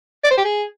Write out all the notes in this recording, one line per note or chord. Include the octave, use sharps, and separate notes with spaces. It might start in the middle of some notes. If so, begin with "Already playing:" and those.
D5
C5
G4
G#4